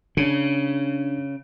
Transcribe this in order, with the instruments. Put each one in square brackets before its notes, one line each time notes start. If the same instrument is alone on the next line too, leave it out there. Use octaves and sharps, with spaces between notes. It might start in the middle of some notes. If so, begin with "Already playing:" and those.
[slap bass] C#3 [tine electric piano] D4